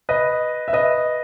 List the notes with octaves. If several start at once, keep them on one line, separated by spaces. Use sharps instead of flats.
B4 D#5
E5
B4 D#5